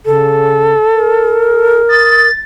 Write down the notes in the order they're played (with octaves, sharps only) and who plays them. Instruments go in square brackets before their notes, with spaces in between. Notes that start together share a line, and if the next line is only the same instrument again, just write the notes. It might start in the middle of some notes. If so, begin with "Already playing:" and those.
[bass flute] C#3 [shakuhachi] A4
[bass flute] A#4
[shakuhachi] D#6 [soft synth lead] A6